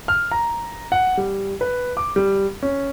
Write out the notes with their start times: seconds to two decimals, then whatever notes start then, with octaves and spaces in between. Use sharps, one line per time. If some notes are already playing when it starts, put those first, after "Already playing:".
0.08 F6
0.32 A#5
0.92 F#5
1.17 G3
1.61 B4
1.97 D6
2.16 G3
2.63 C#4